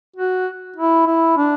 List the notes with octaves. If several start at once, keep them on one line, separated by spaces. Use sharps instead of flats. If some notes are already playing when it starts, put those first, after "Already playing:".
F#4
E4
E4
D4